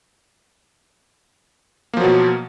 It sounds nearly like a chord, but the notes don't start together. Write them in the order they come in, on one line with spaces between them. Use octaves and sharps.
A#3 F3 F#3 B2